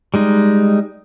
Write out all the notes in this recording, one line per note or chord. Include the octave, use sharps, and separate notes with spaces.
G3 G#3 D#4